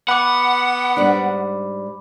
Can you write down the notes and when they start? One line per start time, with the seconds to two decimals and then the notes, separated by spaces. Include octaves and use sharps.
0.08 B3 F#5 B5 D6
0.97 G#2 G3 D4